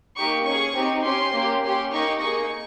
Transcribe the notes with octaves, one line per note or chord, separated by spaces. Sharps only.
A#3 D#4 G4 C#6
C#4 C#6
G#4
C4 D#4 G4
C#4 G4 C6
A#3 C#4 G4
C#4 G4 C6
A#3 D#4 G4 C#6
A#3 D#4 G#4 C#6